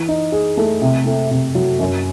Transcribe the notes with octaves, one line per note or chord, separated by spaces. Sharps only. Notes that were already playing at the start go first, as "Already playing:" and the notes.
Already playing: E3
D#4
G#4
A3
C3
A3
C3
F#3
F#2